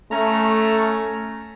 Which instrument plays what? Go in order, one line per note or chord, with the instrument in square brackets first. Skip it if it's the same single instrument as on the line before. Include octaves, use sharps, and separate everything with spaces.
[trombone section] A3 [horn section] C#4 A#5